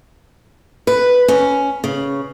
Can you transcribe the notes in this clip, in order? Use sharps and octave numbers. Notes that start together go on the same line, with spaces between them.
B4
C#4
C#3